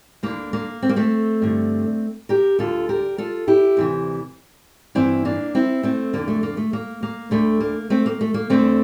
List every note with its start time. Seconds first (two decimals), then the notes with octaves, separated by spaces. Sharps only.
0.23 D2 D3 A#3
0.53 A#3
0.82 C4
0.89 A#3
0.96 A3 C4
1.42 G2 D3
2.29 G4 A#4
2.59 D2 D3 F4 A4
2.89 G4 A#4
3.18 F4 A4
3.48 E4 G4
3.77 D2 C3 E3
4.95 G2 E3 C4 E4
5.25 A#3 D4
5.55 C4 E4
5.83 A3 C4
6.13 F2 D3 A#3
6.28 A3
6.43 A#3
6.57 A3
6.73 A#3
7.03 A#3
7.31 D2 D3 A3
7.60 A#3
7.90 A3 C4
8.06 A#3
8.21 A3
8.34 A#3
8.50 E2 D3 A3 C4